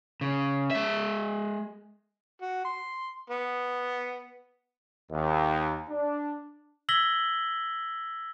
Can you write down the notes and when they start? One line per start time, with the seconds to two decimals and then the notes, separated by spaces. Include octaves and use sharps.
0.21 C#3
0.71 G#3 E5
2.42 F#4
2.65 C6
3.30 B3
5.12 D#2
5.90 D4
6.89 E6 G#6 A#6 B6 F#7 G7